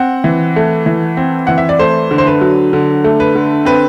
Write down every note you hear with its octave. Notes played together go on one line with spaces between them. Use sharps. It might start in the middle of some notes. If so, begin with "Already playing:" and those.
Already playing: C4 F#5
E3
A3
E3
C4
E3 F#5
E5
D5
A3 C5
D3
C5
B4
F#3
D3
A3
B4
D3
C4 B4